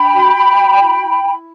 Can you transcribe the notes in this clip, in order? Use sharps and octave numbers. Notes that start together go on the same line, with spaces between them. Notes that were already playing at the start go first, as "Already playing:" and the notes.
Already playing: D4 G5 B5
F#4
F#4
F#4
E4
E4
E4